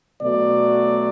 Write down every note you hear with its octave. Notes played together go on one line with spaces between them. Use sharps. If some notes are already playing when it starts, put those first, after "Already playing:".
B2 F#3 A3 D5